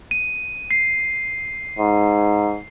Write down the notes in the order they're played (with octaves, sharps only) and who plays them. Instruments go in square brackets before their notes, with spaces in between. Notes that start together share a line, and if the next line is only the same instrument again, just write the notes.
[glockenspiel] D#7
C7
[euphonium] G#2